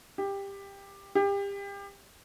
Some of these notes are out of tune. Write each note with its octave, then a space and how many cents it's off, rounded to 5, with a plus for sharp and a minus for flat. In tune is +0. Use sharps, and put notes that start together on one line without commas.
G4 +15
G4 +30